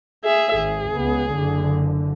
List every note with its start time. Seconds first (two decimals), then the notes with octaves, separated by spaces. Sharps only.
0.24 G#4 E5
0.55 G#1 G#4
0.94 C#2 B3
1.34 F#1 D3